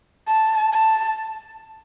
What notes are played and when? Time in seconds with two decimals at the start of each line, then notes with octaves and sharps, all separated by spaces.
0.27 A5
0.73 A5